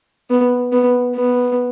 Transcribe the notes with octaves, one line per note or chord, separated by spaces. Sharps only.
B3
B3
B3